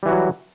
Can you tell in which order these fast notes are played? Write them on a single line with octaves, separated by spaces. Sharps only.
G3 E3 F#4 F#3